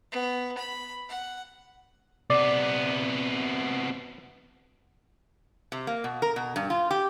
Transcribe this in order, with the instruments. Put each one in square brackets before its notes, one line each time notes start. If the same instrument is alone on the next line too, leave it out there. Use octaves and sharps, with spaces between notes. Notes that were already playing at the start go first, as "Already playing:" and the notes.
[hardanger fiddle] B3
B5
F#5
[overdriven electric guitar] C3 B3 [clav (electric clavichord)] D5
[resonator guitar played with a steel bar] C3
A#3
B2
A#4
B2
G2
F4
G4